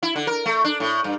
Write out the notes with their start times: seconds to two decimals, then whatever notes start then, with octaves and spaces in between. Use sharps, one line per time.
0.03 E4
0.16 D3
0.27 A#4
0.46 A3
0.64 D4
0.80 A2
1.04 G2